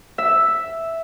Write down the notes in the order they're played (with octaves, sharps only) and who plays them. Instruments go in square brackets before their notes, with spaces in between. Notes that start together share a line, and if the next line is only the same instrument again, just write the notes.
[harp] E5